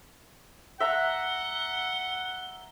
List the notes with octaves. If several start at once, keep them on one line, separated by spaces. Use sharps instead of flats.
E5 F#5 A#5 G7